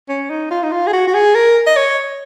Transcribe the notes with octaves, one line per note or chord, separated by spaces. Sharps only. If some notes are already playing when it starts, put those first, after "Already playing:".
C#4
D#4
F4
D#4
F4
G#4
F#4
F#4
G#4
A#4
D#5
C#5